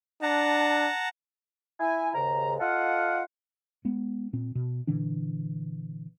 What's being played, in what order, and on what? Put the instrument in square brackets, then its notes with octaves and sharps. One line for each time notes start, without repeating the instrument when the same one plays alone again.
[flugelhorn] D4 [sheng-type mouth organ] F#5 A5 A#5
[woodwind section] E4 G#5
D#2 G#2 C#3 A#5
F4 A4 D#5 F5 F#5
[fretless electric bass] G#3 B3
A#2 C4
B2
A#2 D3 E3 D4